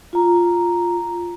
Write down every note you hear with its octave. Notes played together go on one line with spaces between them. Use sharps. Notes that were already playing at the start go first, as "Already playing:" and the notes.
F4 A#5